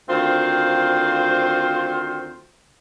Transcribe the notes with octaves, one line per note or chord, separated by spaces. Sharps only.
D2 D#3 C4 F4 C5 F5